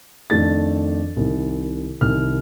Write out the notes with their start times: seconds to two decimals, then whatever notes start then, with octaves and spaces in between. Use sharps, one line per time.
0.30 F2 D#3 A3 D4 A6
1.16 C2 C3 D#3
2.01 C2 C3 D#3 F6